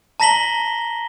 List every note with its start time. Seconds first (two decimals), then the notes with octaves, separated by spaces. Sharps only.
0.20 A5 A#5 A#6 B6 F#7 G7